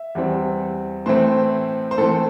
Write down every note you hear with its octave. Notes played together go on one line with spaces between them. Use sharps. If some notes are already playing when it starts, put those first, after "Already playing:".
Already playing: E5
E2 E3 G3 C4
A2 E3 A3 C4 C5
C5
A2 E3 A3 C4 A4